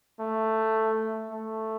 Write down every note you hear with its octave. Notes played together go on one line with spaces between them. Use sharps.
A3
A3